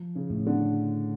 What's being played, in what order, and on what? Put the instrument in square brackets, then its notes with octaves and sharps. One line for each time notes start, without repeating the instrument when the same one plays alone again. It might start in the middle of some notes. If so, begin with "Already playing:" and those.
Already playing: [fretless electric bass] F3
[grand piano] C#3
[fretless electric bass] A2
[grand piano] D3